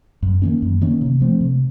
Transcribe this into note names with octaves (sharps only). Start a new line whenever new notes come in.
F#2
D#3 A#3 C#4
F#2
D#3 A#3 C#4
C3
F3 A3 C4
C3